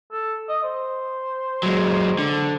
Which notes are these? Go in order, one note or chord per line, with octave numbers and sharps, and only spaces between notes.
A4
D#5
C5
F#3 G#3
D3